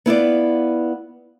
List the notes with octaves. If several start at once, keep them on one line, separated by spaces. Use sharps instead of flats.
B3 E4 F4 D5